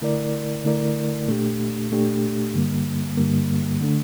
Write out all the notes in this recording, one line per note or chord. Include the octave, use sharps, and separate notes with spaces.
D3 A3 E4 A#4 D5
D3 A3 E4 A#4 D5
A#2 A3 D4 G4
A#2 A3 D4 G4
G2 D3 G3 A#3
G2 D3 G3 A#3
D3 A3 D4